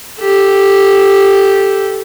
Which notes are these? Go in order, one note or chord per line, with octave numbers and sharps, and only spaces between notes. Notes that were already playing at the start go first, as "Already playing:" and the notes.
G4 A4